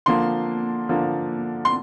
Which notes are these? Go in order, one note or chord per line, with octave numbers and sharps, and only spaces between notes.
D3 F3 A#3 C6
D3 F3 A#3
C6